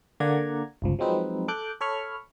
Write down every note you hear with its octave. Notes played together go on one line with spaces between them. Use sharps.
D3 A#3 D5 F#5 A#5 G#6
G1 C#2 F3
F3 F#3 G#3 C4 D#4 B4
A4 D6 F#6 G6
A4 C#5 B5 C#6 F6